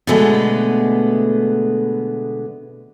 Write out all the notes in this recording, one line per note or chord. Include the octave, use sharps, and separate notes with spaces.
B2 D3 G#3 A3 B3